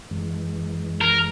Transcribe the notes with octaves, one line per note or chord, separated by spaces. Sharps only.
F#2 E3 G#3
A#4